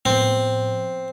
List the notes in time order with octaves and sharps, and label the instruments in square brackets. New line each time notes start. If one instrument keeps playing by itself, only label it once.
[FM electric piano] A2 F3 B3 [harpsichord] C4